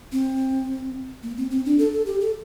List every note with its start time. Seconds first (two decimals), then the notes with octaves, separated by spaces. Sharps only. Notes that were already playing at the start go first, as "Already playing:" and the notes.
0.12 C4
1.23 A#3
1.37 C4
1.51 C4
1.65 D4
1.79 A4
1.93 A4
2.06 G4
2.21 A4